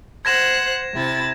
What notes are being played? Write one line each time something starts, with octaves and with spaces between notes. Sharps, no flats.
C5 F#5 F#6 G#6 A#6 E7
C3 E4 A6